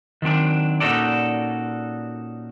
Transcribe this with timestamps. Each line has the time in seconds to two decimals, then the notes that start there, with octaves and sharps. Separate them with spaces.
0.22 D#3 F#3 C4 D4
0.80 A#2 C#4 D#4 F#4 A4 D5